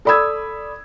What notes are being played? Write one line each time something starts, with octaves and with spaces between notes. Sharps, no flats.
A4 D5 B5 D#6 E6 G#6